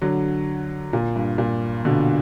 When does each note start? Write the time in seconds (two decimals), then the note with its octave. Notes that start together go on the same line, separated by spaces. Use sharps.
0.01 D3 F#3
0.93 A#2
1.16 G2
1.38 A#2
1.85 B2 D3